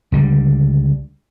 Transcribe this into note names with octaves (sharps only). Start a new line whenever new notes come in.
C#2 D3 G3